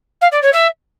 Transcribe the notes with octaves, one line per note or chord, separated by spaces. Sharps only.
F5
D5
C#5
E5